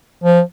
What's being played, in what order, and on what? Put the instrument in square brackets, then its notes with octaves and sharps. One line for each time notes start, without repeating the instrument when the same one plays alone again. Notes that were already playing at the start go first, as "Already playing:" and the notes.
[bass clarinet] F3